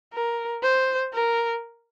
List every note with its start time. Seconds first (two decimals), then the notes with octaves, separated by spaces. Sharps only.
0.13 A#4
0.63 C5
1.13 A#4